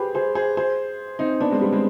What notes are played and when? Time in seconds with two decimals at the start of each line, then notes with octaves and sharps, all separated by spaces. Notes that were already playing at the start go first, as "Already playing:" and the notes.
Already playing: G4 G#4 B4 C5
0.15 G#4 C5
0.35 G#4 C5
0.57 G#4 C5
1.19 C4 D#4
1.40 B3 D4
1.51 G#3 C4
1.61 G3 B3
1.72 G#3 C4